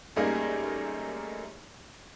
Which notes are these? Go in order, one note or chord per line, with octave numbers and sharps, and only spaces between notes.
F#2 G3 A3 A#3 D#4 G#4